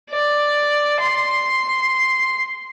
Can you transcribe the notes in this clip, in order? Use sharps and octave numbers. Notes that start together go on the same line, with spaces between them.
D5
C6